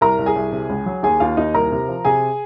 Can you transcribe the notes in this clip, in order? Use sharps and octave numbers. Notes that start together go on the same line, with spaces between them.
C2 A#4 A#5
C2
G#4 G#5
C2
C3
C#2
F#3
D#2 G#4 G#5
D#2 F4 F5
D#2 D#4 D#5
C2 A#4 A#5
C3
F3
C3 G#4 G#5